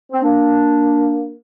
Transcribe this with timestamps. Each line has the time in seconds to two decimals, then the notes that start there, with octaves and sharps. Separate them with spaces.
0.12 C4
0.22 A#3 D4